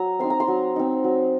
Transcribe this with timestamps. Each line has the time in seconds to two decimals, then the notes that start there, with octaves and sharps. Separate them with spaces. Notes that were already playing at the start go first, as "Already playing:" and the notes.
Already playing: F#3 A#5
0.19 C4 D#4 C6
0.30 A#5
0.40 C6
0.48 F#3
0.76 C4 D#4
1.04 F#3